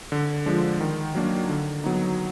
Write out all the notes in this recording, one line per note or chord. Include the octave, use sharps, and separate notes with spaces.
D3
F3 G#3 D4
D#3
F#3 A#3 D4
D3
F#3 B3 D#4